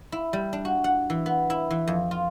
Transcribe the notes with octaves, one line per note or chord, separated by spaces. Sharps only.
E4
G3
D4
F#4
F#5
E3
B3
E4
E3
F2
F4